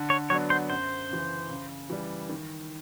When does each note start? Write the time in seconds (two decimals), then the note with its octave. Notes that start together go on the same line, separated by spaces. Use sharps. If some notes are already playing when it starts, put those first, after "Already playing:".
Already playing: D3
0.10 C#5
0.30 F#3 B3 D4 C#5
0.50 C5
0.70 F#2 C5
1.10 C#3 E3
1.50 C#3
1.90 E3 G3
2.29 D#3